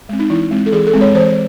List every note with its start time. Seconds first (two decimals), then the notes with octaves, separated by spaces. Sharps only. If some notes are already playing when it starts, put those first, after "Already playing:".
0.09 G#3 C4
0.19 D#4
0.30 E3 E4
0.51 G#3 C4
0.66 A4
0.72 E3 G#4
0.87 A4
0.94 G#3 C4
1.01 C#5
1.15 E3 C5